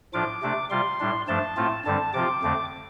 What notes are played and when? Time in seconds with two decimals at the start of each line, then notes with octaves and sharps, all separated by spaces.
0.14 A2 F3 D4 F4 D6
0.42 C3 A3 D4
0.70 C3 G3 F4 C6
1.00 A2 G3 D4
1.28 G2 F3 A3 D4 A5
1.57 A2 A3 C4 F4
1.85 G2 D3 G3 C4 A5
2.14 C3 F3 C4 F4 D6
2.43 F2 D3 A3 C4